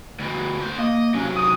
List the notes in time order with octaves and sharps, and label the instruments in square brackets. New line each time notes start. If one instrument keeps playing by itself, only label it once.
[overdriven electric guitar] D2 B2
D2 C5
[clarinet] A#3 [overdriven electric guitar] D#5
[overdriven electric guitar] C3 F#3 [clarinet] C#4
[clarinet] D#6